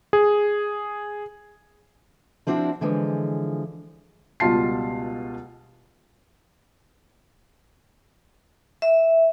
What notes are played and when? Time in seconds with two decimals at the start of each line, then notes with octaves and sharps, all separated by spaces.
0.13 G#4
2.47 F3 C4 D4 E4 F#4
2.81 D3 E3 F3 G#3
4.40 C#2 B2 G3 F4 A5 C7
8.82 E5